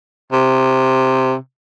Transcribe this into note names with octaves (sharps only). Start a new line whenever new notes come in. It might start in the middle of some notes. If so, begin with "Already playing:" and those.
C3